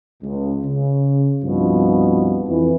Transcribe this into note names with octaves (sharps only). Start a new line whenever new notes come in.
C#2
C#3
C2 G2 B2 F3
F2 E3